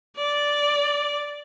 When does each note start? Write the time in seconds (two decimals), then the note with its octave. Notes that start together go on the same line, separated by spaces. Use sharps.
0.17 D5